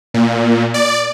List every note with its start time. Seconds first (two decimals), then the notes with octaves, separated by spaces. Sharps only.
0.14 A#2
0.74 D5